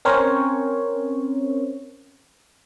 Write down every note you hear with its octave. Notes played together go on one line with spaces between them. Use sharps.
C4 C#4 A#4 C5 C#5